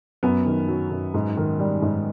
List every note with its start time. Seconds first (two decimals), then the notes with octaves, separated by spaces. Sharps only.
0.23 F#2 B3
0.46 D#3
0.68 F#3
0.91 F#2
1.14 G#2
1.37 D#3
1.59 G3
1.82 G#2